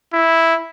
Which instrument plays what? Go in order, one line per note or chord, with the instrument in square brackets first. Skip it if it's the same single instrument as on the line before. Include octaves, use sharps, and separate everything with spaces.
[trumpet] E4